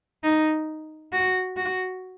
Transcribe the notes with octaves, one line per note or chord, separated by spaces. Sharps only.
D#4
F#4
F#4